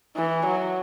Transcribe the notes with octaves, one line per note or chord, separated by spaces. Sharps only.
E3
F#3